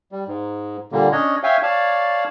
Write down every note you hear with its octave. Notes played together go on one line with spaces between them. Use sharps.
G3
G#2
A#2 D3 G3 A#3
C#4 D4 C#5 D#5
C#5 E5 F5 G5 G#5
C#5 D5 F5 A5